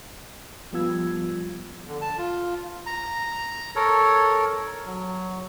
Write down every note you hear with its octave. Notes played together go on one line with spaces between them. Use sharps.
F3 G3 B3 F4 E6 G#6
D3
A5
F4
A#5
A4 A#4 C#5
F#3